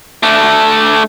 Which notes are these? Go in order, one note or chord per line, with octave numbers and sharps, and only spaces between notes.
A3 D4